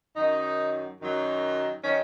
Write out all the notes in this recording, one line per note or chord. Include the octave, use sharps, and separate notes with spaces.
F#2 D#3 F#3 D#4
F#2 D#3 F#3
D#3 F#3 C#4